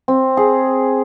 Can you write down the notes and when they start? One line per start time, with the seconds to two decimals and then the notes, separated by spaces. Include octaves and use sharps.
0.08 C4
0.37 G#4